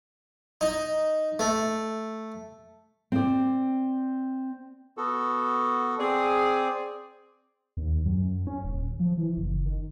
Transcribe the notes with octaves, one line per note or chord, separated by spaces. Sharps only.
D#4
A3
C4 D5
B3 F#4 A4
C4 G#4 D5
D#2
F#2
F#2
C#4
D#1
F3
E3
F#1
D#3